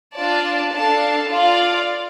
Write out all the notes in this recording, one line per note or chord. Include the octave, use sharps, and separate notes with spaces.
D4 F4 D5 A5
D4 A4 F5 A5
F4 D5 F5